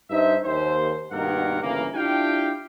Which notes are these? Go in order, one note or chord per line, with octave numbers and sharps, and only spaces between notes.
G2 D#4 C5 E5
D#2 C5
G2 B2 D#3 A#3 A#4 F#5
G1 C#3 E3 A#3
D4 E4 F4 G4 F5 G5